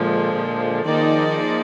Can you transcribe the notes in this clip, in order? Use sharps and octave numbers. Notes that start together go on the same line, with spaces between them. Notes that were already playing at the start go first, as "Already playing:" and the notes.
Already playing: A#2 D3 F3 G#3
A#2
D#3 F3 A#3 D#4 G#4 D5